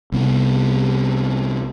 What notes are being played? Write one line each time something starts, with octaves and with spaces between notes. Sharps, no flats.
C2 B3